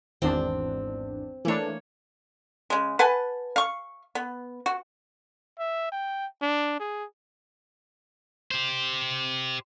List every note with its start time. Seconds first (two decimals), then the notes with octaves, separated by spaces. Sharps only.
0.22 G#1 E2 C4 D4
1.45 E3 A3 A#3 D4 C#5
2.70 C#3 G#3
2.99 B4 F#5 G#5 A5
3.56 F5 C#6
4.15 B3
4.66 F#4
5.59 E5
5.92 G5
6.42 D4
6.80 G#4
8.51 G4 C5